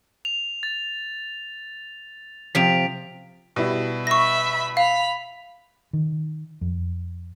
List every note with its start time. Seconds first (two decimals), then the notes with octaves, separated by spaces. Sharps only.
0.25 F7
0.63 A6
2.55 C3 F3 B6 D7 F7
3.56 B2 G3 E4
4.07 E5 B5 C#6 A#6
4.77 F5 B5 F7
5.93 D#3
6.61 F2